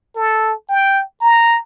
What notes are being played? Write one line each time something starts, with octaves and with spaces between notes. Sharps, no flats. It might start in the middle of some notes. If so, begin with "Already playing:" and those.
A4
G5
A#5